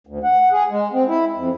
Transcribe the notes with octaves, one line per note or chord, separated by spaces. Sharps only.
D2
F#5
G#4
G#3
C4
E4
F2